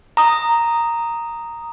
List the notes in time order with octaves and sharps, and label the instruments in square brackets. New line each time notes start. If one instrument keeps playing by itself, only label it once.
[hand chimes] A#5 D#6